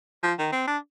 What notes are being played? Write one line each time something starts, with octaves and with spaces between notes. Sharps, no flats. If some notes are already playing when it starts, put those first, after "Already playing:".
F3
D#3
C4
D4